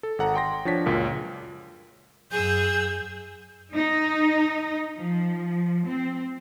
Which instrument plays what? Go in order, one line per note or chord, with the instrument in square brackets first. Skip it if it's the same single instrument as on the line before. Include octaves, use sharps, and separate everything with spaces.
[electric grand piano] A4
G#1 A4 F#5 A#5
G5 C6 A#6
F3 D4 C#5 B6
C#2 F#2 A#2
[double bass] F#2 [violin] G#4 E6 [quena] G6
[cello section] D#4
F3
C4